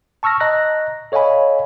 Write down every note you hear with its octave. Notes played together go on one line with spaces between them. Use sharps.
A5 C#6 E6 F6 A#6
D#5 A#5 F#6 A#6
A4 C#5 D#5 F5 G#5 B5